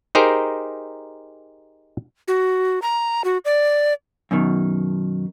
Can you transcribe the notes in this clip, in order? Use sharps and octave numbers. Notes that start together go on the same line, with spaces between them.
D#4 G4 G#4 A#4 C5
F#4
A#5
F#4
D5
F#2 B2 D#3